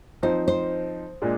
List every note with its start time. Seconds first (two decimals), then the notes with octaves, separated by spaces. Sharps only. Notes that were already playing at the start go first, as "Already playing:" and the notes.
0.23 F3 C4 D#4 C5
0.48 C5
1.22 A#2 G#3 D4